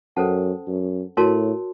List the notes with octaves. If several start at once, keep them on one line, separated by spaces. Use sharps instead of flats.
F#2 C#4 A4 C5 F#5 A5
F#2
A2 F#4 A#4 C#5 A5 C6